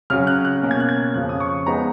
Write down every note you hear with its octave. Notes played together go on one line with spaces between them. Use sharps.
C#3 F#3 C#4 F6
F#6
F#6
B2 A#3 C#4
G#6
F#6
G#6
F2 C#3 F3 F#6
D#6
C#6
F3 G#3 B3 D#4 A#5